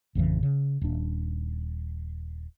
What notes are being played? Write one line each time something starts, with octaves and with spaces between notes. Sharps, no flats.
A1 F2 C#3 E3
C#3
D#1 D4